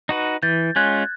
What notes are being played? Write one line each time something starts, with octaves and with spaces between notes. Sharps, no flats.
D#4 F#4 B4
E3 G6 A6
G#3 C#4 F4 F#6 G#6